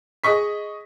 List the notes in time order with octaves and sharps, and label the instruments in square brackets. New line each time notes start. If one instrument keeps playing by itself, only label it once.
[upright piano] G#4 D#5 C#6 B6